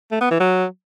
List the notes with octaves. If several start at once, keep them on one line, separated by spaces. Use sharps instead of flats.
A3
B3
E3
F#3